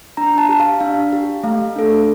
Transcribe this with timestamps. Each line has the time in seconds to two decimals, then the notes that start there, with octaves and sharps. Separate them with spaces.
0.17 D4 A#5
0.38 A5
0.49 G4
0.60 F5
0.80 D4 F5
1.13 G4
1.44 A3 F5
1.76 D4 A4